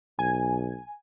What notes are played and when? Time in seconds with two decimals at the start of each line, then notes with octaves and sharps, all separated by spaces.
0.19 B1 G#5